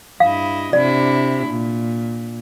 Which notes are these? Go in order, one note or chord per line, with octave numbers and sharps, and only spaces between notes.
G2 E4 D#5 F5
C3 D4 E4 D5
A#2